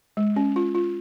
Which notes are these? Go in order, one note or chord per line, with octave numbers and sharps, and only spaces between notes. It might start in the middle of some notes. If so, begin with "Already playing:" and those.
G#3
C#4
F4
F4